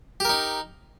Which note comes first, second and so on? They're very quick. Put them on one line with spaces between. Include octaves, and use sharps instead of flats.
G4 A#4 D#4